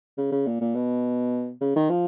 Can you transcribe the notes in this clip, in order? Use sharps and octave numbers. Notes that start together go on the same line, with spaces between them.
C#3
C#3
A#2
A#2
B2
C#3
D#3
F3